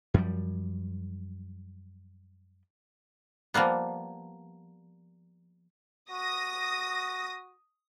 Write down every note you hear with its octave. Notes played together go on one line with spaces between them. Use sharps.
F#2 F3 G3
F3 G3 A#3 B3
F#4 D#6 A#6